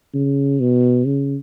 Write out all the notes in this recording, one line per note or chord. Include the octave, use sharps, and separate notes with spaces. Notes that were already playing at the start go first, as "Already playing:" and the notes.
C#3
B2
C#3